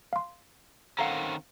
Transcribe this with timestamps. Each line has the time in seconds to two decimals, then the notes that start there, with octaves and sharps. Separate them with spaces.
0.13 F5 C6
0.99 D#3 C4 C#4 A4 F5 F#5 A#5